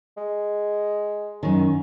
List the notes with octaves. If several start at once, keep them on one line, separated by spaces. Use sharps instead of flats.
G#3
F#2 D#3 C#4